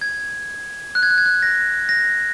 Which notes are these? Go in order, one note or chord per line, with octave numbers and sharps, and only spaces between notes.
G#6
F#6
G#6
F#6
G#6
F#6
A#6
A#6